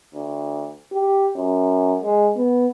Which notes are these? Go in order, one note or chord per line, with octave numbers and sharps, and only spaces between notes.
D2
G4
F#2
G#3
B3